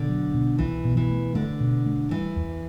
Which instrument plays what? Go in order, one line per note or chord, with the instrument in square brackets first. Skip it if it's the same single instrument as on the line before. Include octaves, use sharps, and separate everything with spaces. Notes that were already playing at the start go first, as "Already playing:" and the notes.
Already playing: [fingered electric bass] B2 [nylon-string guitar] D3
[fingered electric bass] F#3
B2
[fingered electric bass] C2 [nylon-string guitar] E3
[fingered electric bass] B2
[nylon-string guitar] E3
[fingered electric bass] A3
[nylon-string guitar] D3 [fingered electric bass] A3
[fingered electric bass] B2
A3
[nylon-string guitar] E3 [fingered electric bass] G3
[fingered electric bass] E2